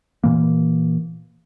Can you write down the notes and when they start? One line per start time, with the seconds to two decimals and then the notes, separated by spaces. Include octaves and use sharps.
0.24 A#2 E3 A#3